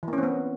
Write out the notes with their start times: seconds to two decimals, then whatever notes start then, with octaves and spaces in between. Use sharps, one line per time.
0.03 E3
0.08 A#3
0.13 C#4
0.18 C4
0.23 B3